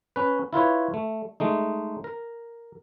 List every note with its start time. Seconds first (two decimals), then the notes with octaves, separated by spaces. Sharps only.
0.16 C#4 B4
0.53 E4 F4 B4 C#5
0.94 A3
1.40 G#3 A3 D#4
2.04 A#4